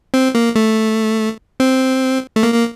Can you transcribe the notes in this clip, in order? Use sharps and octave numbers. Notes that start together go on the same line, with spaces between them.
C4
A#3
A3
C4
A3
A#3
A#3